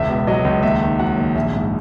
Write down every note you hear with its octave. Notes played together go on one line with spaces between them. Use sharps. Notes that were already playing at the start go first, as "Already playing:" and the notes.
Already playing: E1 C#2 E5
B2
F#3 D#5
C#2
D#2 E5
D#3
F#3 F#5
D#2
A#1 E5
G#2